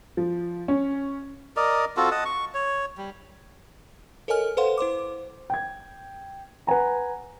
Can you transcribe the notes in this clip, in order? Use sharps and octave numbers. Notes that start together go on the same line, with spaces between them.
F3
C#4
A#4 D5 D#5
C4 F4 F#4 A4
D#5 F#5 A5
C#6
C#5
G3
A4 A#4 C#5 D#5 G#5 F6
A4 B4 C5 F5 F#5 C6
E4 C5 C6 D6
G5 G#6
B4 F#5 G#5 A#5